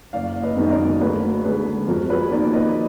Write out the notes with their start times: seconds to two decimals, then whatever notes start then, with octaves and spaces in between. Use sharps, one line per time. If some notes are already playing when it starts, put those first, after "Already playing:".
0.13 F#1 D5 F5
0.43 B4 D#5
0.57 F#2 D#3 G#3 B3
0.63 D#5
0.71 A#4 D5
1.00 D2 G#4 B4
1.44 D3 G#3 G#4 B4
1.87 F2 F#4 A#4
2.09 G#4 B4
2.31 D#3 A#3 A#4 D5
2.53 B4 D#5